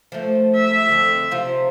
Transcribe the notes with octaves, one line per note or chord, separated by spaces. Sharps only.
F3 A3
E5
F2 D3
C3 F3 F4